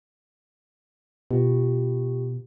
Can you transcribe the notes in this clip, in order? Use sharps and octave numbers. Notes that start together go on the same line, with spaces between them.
B2 F4 G4